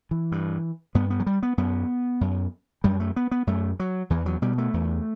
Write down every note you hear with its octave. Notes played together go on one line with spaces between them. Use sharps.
E3
G2
G2 B3
B3
F#3
G3
B3
F#2 B3
F#2
F#2 G3
A3
B3
B3
F#2 A3
F#3
E2 E3
F#3
B2 G3
A3
E2